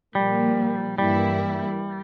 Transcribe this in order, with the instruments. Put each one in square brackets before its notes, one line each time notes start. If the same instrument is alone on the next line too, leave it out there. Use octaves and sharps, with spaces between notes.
[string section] A#2 F3 A#3 [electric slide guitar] G3
[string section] G2 E3 A#3 E4 [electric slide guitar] G3